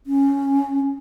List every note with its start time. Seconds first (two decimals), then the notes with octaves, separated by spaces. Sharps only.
0.07 C#4